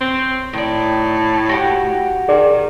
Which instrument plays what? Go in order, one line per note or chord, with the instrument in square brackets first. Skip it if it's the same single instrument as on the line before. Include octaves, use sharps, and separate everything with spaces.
[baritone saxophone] C4 [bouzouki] C#5
[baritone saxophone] A2 [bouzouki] D#3 D5
[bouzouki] F#4 G4 F#5
[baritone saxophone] D#3 [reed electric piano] G#4 D5